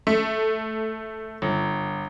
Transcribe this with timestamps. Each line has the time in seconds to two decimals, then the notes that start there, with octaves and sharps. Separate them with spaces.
0.07 A3
1.42 G1